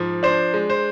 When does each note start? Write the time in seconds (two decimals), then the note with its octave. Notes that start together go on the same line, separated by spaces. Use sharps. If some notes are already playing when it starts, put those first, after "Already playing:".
Already playing: G#2 F3
0.23 D4 C5
0.54 G#3
0.70 C5